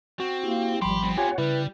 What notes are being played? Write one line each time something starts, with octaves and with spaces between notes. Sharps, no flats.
C4 F#4
A#3 E4 G4
G#1 F3 G3 G4 B5 C6
B3 C4
F4 G4 C#5 F#5 G#5
C#3 G3 E4 B4